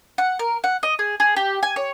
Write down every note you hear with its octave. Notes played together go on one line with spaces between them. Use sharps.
F#5
A#4
F#5
D#5
G#4
G#4
G4
G#5
C#5